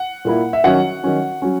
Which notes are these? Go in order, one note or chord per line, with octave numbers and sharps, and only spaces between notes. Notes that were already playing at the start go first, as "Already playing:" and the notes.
Already playing: F#5
A#2 A#3 E4
E5
D#3 F#3 C#4 F#5
D#3 F#3 C#4
F#3 C#4